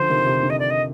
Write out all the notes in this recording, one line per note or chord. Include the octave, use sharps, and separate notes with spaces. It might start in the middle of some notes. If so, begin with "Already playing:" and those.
Already playing: D3 F3 C5
C3 D#3
C3
D3
D#5
D5
D#5